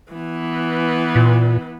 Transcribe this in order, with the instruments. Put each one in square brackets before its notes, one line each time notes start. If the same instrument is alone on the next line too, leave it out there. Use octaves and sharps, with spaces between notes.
[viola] E3 B3
[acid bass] A#2